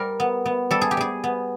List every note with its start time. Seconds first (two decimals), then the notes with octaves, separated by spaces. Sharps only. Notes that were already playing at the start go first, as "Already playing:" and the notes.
Already playing: G3 A#4
0.20 B3
0.46 B3
0.71 G3 A4
0.81 G#4
0.91 G4
0.97 G3 G#4
1.24 B3